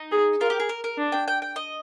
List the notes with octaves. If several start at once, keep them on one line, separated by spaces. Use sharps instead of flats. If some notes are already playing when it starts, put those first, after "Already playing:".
Already playing: D#4
G#4
F4 A#4
G4
G#4
A#4
A#4
D4
G5
G5
G5
D#5